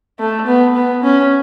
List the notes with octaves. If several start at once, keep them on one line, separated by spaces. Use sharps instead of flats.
A3
B3
B3
C#4